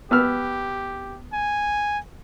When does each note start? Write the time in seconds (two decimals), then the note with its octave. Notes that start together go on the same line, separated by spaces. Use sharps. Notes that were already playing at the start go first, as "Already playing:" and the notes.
0.11 B3 G4 E6 F6
1.33 G#5